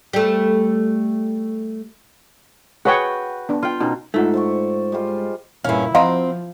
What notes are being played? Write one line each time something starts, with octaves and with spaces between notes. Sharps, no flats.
G3 A3
F#4 G#4 B4 C#5 F#5 G5
B3 D4
F4 G5
B2 C#4 D#4
G#2 A3 D#4 F4 F#5
C5 D5 C#6
G3 G#3 F4
G2 A#2 C#4 E4 G#4 F5
F3 C4 F#4 C5 D#5 F5 A#5